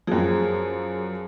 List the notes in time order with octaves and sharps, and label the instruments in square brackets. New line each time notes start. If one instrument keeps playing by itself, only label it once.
[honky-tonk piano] F#2 F3 [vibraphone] G#4